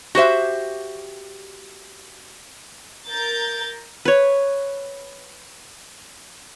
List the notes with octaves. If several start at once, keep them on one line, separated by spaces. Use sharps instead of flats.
F#4 G4 C5 E5
A#4 G6 A6
B4 C#5